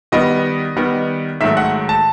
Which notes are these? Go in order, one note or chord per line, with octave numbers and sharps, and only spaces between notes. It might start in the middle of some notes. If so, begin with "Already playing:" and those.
D#3 G3 B3 D#5
D#3 G3 B3
G#2 D#3 F#3 A3 E5
F#5
A5